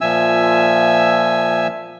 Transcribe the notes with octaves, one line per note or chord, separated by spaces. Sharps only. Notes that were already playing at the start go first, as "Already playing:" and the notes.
A#2 F3 E5 G#5 E6